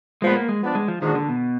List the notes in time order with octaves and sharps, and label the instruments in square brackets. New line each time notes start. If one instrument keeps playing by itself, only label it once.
[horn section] A#2 F3 B3 [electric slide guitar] G#3
[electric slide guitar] A#3
G#3
[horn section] F3 B3 D4
[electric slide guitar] G#3
F3
[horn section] A#2 F3 G#3 D4 F#4 [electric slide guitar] D#3
[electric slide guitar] D3
B2